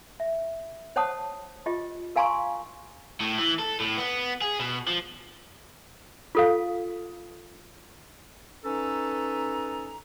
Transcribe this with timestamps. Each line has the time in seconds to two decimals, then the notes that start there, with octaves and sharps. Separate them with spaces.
0.20 E5
0.96 C5 C#5 F#5 A5 D#6
1.66 F4 G4 D#5
2.16 A#4 F5 G#5 A#5 C6 C#6
3.21 A2
3.39 E3
3.60 A4
3.80 A2
3.98 B3
4.42 G#4
4.59 B2
4.87 F3
6.35 F4 A4 F5
8.64 C#4 D#4 A4 B4 G#5 A#5